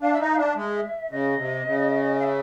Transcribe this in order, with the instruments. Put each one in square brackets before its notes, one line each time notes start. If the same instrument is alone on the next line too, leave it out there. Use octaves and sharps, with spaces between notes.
[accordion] D4 [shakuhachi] F5
[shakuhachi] E5
[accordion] D#4 [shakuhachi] D#5
[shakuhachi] F5
[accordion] D4 [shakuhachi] E5
[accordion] G#3
[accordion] C#3 [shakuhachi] D#5
[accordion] C3
C#3
[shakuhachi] F5
E5